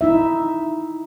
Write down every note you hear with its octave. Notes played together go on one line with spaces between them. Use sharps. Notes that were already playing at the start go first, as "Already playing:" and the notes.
D#4 E4 E5